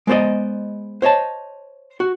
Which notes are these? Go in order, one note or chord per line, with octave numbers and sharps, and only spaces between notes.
G#3 B3 C5 D5 D#5
C5 C#5 D#5 A5
F#4